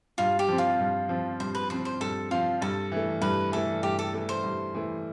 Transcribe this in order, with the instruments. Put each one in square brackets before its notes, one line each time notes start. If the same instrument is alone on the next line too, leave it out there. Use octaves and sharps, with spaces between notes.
[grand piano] G2 [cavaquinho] F4
[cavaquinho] G4
[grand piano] F3 C4
[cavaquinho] F4
[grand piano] G2
F3 C4
[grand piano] G2 [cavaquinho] C5
[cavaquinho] B4
[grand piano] F3 C4 [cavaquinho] C5
[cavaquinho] C5
[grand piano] G2 [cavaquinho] A4
[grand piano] F3 C4 [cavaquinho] F4
[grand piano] G2 [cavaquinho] A4
[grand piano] E3 A3
[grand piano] G2 [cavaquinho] B4
[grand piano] E3 A3 [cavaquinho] A4
[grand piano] G2 [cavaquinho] G4
[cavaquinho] A4
[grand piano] E3 A3
[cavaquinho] C5
[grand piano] G2
E3 A3